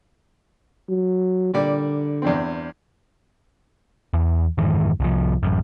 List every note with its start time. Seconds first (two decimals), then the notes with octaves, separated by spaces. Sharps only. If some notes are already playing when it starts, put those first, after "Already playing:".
0.89 F#3
1.54 A#2 D3 G3 D5
2.22 E2 G2 C4
4.14 E2
4.58 F2 G#2 D#3 E3
5.00 C2 F3
5.43 A1 F#2